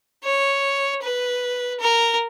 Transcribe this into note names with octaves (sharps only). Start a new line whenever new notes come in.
C#5
B4
A#4